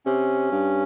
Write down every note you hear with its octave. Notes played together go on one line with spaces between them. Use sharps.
C3 C#4
G2